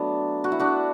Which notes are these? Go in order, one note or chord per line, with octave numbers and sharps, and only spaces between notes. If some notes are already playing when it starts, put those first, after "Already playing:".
Already playing: F#3 A3 B3 D4
F#4
E4
D4 F#4